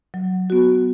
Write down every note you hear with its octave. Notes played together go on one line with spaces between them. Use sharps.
F#3
B3 F#4